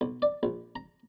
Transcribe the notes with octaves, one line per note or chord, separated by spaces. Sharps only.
B1
D5
A#1
A#5